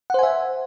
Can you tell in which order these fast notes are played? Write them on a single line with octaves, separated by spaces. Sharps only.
F#5 C5 G#5 E5